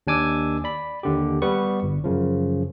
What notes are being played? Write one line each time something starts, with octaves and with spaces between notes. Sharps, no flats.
D#2 D4 G#5 D6 E6
D5 B5
D#2 D3 G4
G3 B3 B4 C#6
G1
F#2 C#3 F3